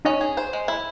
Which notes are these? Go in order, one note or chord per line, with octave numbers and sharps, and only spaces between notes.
C#4 D#4 D#5
G#4
C5
G#3
E4